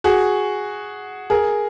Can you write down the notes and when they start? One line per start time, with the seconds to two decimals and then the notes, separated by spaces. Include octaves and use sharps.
0.04 F#4 G#4
1.30 G#4 A#4